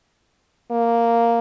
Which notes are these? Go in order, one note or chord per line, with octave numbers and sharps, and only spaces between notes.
A#3